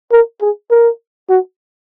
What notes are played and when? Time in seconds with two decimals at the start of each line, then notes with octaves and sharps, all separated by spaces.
0.12 A#4
0.41 G#4
0.71 A#4
1.30 F#4